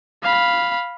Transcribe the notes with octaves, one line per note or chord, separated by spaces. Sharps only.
F5 B5